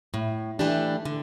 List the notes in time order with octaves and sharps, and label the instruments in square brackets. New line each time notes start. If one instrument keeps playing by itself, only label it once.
[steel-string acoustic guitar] A2
E3 A3 D4 G4
D3